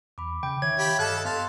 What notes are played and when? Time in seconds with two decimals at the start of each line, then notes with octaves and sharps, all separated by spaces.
0.18 E2 B5 D6
0.43 C#3 G5
0.62 D#3 C#5 E5 G#6
0.79 G4 F5 B5
0.99 G2 A4 D#5 A5 F6 F#6
1.25 B3 F5 A5 C6 A6